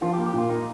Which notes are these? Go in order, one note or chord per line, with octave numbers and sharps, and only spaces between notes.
F3 F4
G4
A#3
G4
A#2 F4
A#3 D#4